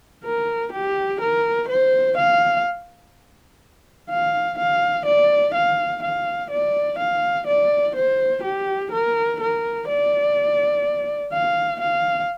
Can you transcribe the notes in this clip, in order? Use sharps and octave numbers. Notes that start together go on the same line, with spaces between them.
A#4
G4
A#4
C5
F5
F5
F5
D5
F5
F5
D5
F5
D5
C5
G4
A#4
A#4
D5
F5
F5